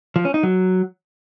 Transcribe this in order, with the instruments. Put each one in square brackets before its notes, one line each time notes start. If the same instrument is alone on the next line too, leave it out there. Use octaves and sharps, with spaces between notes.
[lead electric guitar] F3
C#4
D#4
F#3